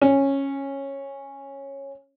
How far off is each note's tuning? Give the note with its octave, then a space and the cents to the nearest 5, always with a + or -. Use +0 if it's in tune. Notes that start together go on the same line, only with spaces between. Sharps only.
C#4 -10